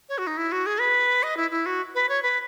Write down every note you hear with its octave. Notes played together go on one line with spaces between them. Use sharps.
C#5
F#4
D#4
E4
F#4
G#4
B4
D#5
E4
E4
F#4
B4
C#5
B4